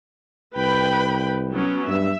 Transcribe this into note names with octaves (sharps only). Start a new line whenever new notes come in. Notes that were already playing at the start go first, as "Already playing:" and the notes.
C2 B4 G5 B5
F#3 B3 C#4
G2 E5